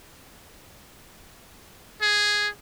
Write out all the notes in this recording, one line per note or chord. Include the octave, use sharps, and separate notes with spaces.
G#4